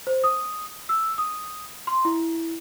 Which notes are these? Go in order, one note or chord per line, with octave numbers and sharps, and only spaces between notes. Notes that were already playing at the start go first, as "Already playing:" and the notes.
C5
D#6
E6
D#6
C6
E4